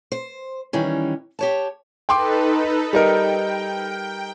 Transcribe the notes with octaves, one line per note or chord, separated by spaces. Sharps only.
C5
D#3 E3 G3 C#4
G4 C#5 A5
D#4 A4 B4 G5 C6 D6
G3 D#4 A#4 G5